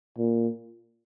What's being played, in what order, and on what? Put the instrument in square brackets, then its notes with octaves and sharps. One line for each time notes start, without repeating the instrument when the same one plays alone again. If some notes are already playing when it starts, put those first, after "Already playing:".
[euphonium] A#2